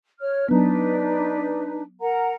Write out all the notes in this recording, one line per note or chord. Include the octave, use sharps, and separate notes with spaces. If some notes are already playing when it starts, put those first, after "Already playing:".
C#5 F6
F#3 B3 D4 D#4 B4
A#4 F#5 A#5